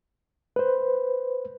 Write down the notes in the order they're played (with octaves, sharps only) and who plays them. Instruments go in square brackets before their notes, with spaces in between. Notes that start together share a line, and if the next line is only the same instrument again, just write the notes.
[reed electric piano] B4 C5